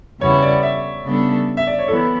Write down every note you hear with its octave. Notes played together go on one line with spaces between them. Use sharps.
E2 C#3 G3 B3 E4 C#5
D5
E5
C#3 G3 B3 D4 A4
E5
D5
C#5
E3 B3 E4 A4